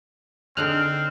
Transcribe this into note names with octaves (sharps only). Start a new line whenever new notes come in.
D3 C4 D#4 G#4 F6 F#6